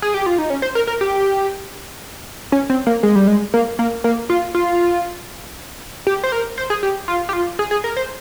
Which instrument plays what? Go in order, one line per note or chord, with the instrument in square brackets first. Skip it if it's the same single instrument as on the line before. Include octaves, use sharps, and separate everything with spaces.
[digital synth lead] G#4
G4
F4
D#4
C#4
C5
A#4
A#4
G4
C#4
C4
A#3
G#3
G3
G#3
A#3
A#3
A#3
F4
F4
G4
C5
A#4
C5
G#4
G4
F4
G4
F4
G#4
G#4
A#4
C5